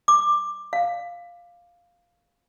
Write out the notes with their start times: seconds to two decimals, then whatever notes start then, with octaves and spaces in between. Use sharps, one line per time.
0.08 D6
0.73 F5